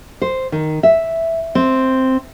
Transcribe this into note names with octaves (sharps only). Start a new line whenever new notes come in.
C5
D#3
E5
C4